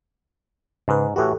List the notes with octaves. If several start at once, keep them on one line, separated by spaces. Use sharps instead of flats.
G#2 C#3 B4
A2 E3 F#4 G4 A4